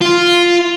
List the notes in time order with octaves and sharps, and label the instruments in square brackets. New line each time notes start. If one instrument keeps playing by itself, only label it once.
[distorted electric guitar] F4